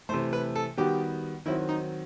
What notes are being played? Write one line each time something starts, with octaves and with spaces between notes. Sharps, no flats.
C3 E3 A3 C5
B4
A4
D#3 G3 B3 F#4 G4
D#3 F#3 C4 E4 F#4
D#4